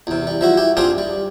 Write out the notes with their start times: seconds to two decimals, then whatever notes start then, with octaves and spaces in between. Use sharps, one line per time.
0.07 E2 C3
0.27 G3
0.41 F3 E4 F#4
0.57 E4 G4
0.77 C4 D4 F4 G4 G#4
0.98 G3